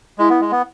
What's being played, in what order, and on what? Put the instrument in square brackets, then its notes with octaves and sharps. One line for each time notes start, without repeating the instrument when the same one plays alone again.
[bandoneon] G#3 [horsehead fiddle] E4
[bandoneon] B3
G#3
B3